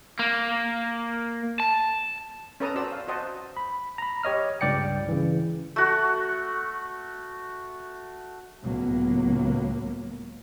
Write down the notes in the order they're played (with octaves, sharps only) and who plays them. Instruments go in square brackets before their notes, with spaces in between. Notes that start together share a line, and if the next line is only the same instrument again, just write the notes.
[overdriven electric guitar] A#3
A5
[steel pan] C#4 A4 B4 A5 A#5 D#6
F#4 C5 D5 A5 E6
F5
F#4 C5 D#5 F#5 A5
[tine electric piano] B5
A#5 B5
G4 C#5 D#5 F6
C#2 G2 D5 G5 C#7
C#3 E3
[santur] A3 F#4
[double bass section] C#2 A2 F#3 A#3 B3